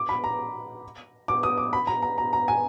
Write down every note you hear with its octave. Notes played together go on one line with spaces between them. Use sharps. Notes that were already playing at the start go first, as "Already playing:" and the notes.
Already playing: D6
B5
A#5
D6
D#6
D6
B5
A#5
A#5
A#5
A#5
G#5